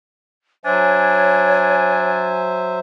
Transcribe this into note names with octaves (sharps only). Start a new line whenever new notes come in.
F#3 D4 C5 C#5 E5 G#5